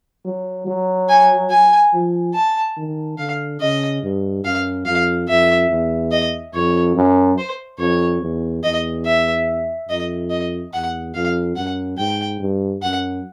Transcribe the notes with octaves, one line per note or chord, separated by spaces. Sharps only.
F#3
F#3
G#5
G#5
F3
A5
D#3
D3 F5
C#3 D#5
G2
F#2 F5
F2 F5
F2 E5
E2
D#5
F2 C#5
F#2
C5
F2 C#5
E2
E2 D#5
E5
F2 D#5
D#5
E2 F#5
F2 F5
F#2 F#5
G#2 G5
G2
F#2 F#5